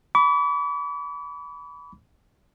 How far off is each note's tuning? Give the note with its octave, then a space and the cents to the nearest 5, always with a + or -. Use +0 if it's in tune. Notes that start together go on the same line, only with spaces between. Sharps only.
B5 +0 D6 -45